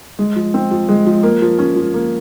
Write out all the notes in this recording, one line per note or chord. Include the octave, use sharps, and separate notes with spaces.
G#3
F3
C4
F3
G#3
F3
A#3
F3
C#4
F3
A#3